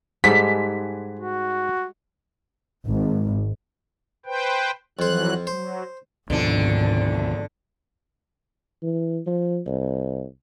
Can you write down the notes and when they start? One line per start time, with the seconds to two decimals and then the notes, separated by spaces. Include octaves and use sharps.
0.24 G#2 G3 G#3 A4 B6
1.19 F#4
2.85 G#1
4.26 B4 C5 G5
4.99 F2 E3 F#3 C5 F#6
5.47 F#3 C5
6.30 G#1 D2 B2 D3 F3 D4
8.83 E3
9.27 F3
9.66 C2